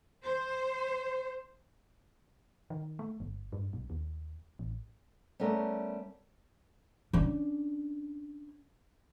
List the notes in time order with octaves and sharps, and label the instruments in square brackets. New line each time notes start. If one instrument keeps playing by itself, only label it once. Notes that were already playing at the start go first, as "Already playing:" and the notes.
[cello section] C5
[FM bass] D#3
A3
G1
G2
B1
D#2
A1
[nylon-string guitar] G3 A3 B3 C#4 A#4
[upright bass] C#4 D4